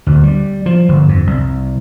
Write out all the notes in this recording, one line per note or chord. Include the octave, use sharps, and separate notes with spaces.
D2
G3
F3
G1
F2
C2